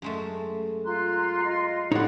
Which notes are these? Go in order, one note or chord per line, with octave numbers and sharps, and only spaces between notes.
F#2 G#3 A3
F4 A#5 C6 F#6
F4 D#5
A2 G3 D#4 G4 C#5 F#5